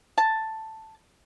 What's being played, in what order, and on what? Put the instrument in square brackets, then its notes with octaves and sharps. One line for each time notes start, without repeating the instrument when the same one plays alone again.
[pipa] A5